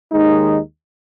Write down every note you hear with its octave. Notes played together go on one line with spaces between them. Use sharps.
D#2 D#3 G#3 D#4